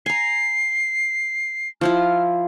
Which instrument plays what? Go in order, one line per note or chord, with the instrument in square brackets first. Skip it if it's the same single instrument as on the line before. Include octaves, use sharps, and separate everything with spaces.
[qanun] G#5 A#5 [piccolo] C7
[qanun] F3 E4 F4 [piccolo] F6